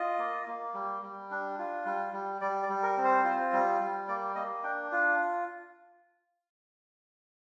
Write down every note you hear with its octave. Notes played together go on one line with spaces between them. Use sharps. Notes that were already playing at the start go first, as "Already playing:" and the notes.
Already playing: F4 D#5
A#3
A#3
G3
G3
D4
F4
G3
G3
G3 D5
D5
G3
A#4
C4
C5
F4
G3
G3
A#3 D5
A#3 D#5
D4 G5
F4